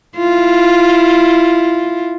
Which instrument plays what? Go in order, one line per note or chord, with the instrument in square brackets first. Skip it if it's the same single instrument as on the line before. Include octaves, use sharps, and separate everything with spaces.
[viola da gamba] E4 F4